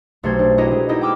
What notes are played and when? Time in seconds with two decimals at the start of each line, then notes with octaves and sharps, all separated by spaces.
0.23 B1 A3 G4 C5 G#6
0.39 D4
0.58 E4 F#4 G4 A#4 D#5
0.72 G#3
0.89 B3 D#4 E4 G4 D#5
1.01 G5 B5 D6 E6 F6